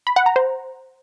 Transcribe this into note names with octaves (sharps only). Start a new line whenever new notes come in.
B5
F#5
A#5
C5